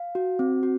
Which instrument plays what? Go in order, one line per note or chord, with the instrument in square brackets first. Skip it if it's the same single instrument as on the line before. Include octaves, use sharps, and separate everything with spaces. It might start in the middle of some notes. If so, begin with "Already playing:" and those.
Already playing: [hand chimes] F5
F#4
C4
F#4